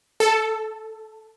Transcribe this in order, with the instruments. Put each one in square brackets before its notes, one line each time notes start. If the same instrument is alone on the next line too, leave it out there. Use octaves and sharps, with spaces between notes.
[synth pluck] A4